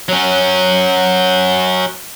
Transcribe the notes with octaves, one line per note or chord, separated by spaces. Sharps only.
F#3 C#4